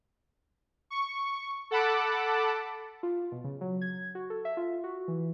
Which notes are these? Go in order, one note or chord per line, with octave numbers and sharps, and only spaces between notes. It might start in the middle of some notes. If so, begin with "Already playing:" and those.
C#6
A4 F#5 A5 B5 D6
F4
B2
C#3
F#3
G#6
F#4
A4
E5
F4
F#4
E3